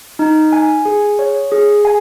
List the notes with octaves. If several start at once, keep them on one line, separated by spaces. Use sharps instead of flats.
D#4
G#5
G#4
C#5
G#4
G#5